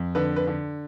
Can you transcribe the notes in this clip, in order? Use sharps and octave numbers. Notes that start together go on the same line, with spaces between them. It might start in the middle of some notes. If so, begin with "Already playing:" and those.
Already playing: F2
D3 B4
B4
D3